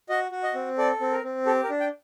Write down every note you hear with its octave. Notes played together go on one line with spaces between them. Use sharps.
F#4 D#5
F#4
D#5
C4
A4 D5
C4
A#4
C4
G4 A4
A#4
D4
G5